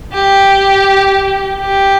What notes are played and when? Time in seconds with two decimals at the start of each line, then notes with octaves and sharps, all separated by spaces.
0.13 G4
1.60 G4